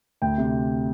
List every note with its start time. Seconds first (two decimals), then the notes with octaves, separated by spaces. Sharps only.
0.22 D2 G5
0.38 C3